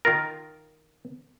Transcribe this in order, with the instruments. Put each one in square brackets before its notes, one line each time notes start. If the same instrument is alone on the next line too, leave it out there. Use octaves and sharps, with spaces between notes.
[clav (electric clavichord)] D#3 F4 A#4